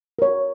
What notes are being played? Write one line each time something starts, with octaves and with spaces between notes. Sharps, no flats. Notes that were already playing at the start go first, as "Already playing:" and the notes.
A#4 C#5